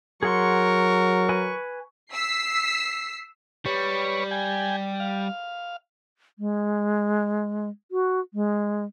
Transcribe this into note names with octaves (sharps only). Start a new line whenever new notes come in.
F#3 G#4 A#4 F#5 C6 C#6
B4 G#5
E6 B6 C7
G3 B4 C#5 C#6
G5 G#5
F5
G#3
F#4
G#3